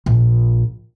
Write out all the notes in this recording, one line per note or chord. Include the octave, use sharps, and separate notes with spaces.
A#1